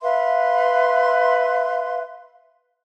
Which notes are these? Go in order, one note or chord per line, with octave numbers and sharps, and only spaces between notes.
B4 E5 F5 C6